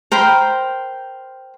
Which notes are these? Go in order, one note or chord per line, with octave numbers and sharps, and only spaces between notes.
A#4 C5 G5 B5